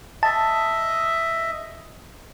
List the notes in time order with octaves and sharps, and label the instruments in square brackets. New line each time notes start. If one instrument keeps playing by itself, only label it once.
[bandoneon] D#5 E5 [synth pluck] A5